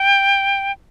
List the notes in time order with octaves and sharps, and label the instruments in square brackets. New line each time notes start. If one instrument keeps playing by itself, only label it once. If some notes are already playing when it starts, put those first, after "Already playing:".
Already playing: [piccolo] G5